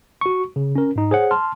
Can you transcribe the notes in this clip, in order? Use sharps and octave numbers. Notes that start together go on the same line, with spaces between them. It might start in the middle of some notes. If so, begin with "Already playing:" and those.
F#4 C#6
C#3
C#4 A#4
G#2 D#4
G#4 C5 C#5 F#5
A5 C6 F6